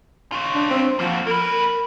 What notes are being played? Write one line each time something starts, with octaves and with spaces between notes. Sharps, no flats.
F4 C#5
D4
C4
F3 A#3 F#4
A#3 A#4 B4